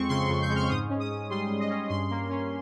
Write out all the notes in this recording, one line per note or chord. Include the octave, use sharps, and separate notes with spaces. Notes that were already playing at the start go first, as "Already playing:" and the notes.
Already playing: F2 G#3 C4 C#6
C#3 C6
F2
G6
G#3
F6
G#2 D#6
C#4
D#6
G#2
G3 C6
G#2
D#5
C#4
G2 C6
A#3
C#4